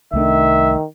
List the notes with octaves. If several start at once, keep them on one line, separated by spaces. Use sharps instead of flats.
C2 D#3 A3 D4 E5